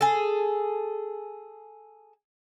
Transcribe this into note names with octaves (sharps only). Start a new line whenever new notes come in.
G#4 A4